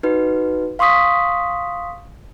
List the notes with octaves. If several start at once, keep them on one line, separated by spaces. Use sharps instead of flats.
D#4 F#4 B4
F5 C6 C#6 D#6 B6